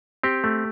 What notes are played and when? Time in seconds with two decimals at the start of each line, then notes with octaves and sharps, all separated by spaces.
0.24 C4 G4
0.44 A3